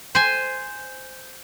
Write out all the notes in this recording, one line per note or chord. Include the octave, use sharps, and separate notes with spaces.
C5 G#5